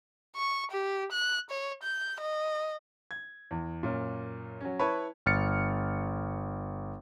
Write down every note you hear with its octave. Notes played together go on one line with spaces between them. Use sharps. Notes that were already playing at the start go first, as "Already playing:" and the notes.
C#6
G4
F#6
C#5
G6
D#5
G#6
E2
F#2 A#2
F#3 C#4
E4 B4 C#5 A5 B5
G1 F6 A6 C#7